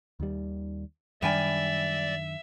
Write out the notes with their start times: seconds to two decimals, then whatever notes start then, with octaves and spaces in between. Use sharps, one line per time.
0.20 D#2 D#3 G3
1.22 F#2 D#3 G3 D4 D5 E5 G5 G#5